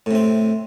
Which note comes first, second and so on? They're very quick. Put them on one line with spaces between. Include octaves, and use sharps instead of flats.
A2 C3 C4